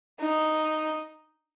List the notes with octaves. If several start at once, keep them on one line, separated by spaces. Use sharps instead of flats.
D#4